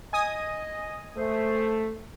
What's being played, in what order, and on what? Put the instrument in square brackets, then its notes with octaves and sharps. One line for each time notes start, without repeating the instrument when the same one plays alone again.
[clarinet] D#5 [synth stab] G#5 D#6
[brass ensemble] A3 [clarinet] C5